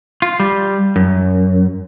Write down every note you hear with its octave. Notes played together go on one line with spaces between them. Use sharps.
F4
G3
F#2